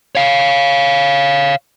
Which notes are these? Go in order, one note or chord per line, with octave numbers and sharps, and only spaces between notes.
C#5 F5